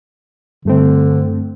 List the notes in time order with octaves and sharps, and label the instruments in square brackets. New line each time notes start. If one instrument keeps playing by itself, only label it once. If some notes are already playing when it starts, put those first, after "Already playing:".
[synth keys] G2 A3 C4 [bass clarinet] D3